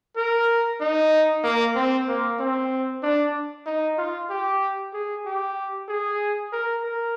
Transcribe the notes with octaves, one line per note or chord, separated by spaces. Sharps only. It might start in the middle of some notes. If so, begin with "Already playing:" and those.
A#4
D#4
A#3
C4
A#3
C4
D4
D#4
F4
G4
G#4
G4
G#4
A#4
A#4